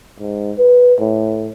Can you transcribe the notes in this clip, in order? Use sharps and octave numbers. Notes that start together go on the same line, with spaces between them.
G#2
B4
A2